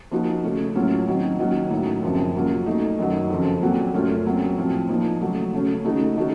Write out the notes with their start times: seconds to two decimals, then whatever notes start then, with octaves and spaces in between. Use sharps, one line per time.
0.11 F3 A#3 D#4 F#4
0.43 C#3 A3 C#4
0.75 A2 F#3 A#3 C#4 F4
1.07 D#3 F#3 C4
1.39 D#3 F#3 A#3 C#4 F#4
1.71 A2 F#3 A#3 D#4
2.02 F#2 C#3 F3 C4
2.35 C#3 F#3 A#3 F4
2.66 A#2 A3 D#4
2.99 F#2 D#3 F#3
3.30 F2 C#3 F3
3.62 A#2 F#3 C4 F#4
3.93 F#2 C#3 A3 C#4 F4
4.26 A#2 F#3 C4
4.57 A2 F3 C4 F4
4.89 A#2 F3 A#3 D#4
5.21 C#3 F#3 A3
5.53 C#3 A3 C#4
5.85 C#3 A3 D#4 F#4
6.16 D#3 A3 C#4 F#4